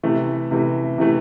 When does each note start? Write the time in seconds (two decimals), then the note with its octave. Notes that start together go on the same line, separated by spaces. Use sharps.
0.03 C3 E3 A3
0.51 C3 E3 A3
0.98 C3 E3 A3